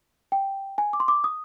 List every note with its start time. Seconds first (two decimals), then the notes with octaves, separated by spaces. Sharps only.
0.32 G5
0.78 G#5
0.93 D6
1.00 C6
1.08 D6
1.24 D#6